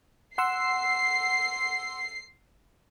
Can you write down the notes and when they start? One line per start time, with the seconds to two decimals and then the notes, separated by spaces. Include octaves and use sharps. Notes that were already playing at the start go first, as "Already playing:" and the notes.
0.38 F#5 C6 E6 C7